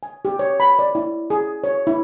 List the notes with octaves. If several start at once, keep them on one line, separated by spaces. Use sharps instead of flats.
G#5
G4
C#5
B5
D5
E4
G#4
C#5
E4